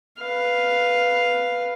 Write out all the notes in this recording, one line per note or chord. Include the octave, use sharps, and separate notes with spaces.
B4 F5